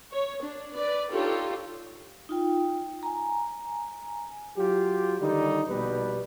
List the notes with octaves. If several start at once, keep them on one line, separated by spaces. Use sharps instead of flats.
C#5
D4
B4 D5
D4 D#4 F4 G4 A4 C#5
D#4 F4 G5
G#5 A#5
F#3 F4 G4
D3 D#3 G3 D#4
A#1 B2 G3 B4